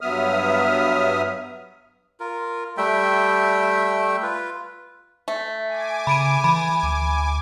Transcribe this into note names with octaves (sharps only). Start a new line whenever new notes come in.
G2 F#3 B3 E5 D#6 F6
F4 A#4
G3 A3 E5 G5
F4 B4
A3
G#5 D6
C#3 B5 D7 D#7
E3 B5
D2